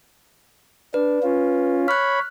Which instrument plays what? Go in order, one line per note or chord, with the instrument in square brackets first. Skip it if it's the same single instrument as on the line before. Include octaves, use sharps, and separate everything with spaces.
[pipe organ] D4 [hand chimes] B4
[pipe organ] C#4 F4
[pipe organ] C#5 B5 [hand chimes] F6 F#6